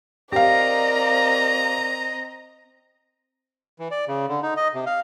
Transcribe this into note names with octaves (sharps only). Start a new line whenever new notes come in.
C4 G4 A#4 D5 D#5 F5 A#5
E3
D5
C#3
D3
D#4
D#5
C3
F5